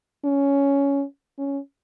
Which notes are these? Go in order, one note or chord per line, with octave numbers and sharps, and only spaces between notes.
C#4
C#4